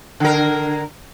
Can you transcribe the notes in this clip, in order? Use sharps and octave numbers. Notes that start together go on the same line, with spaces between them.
D3 A#4